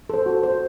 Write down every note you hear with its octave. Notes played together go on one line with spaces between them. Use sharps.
A4 C5
F#4
C5